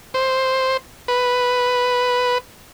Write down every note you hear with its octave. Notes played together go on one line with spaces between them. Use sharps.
C5
B4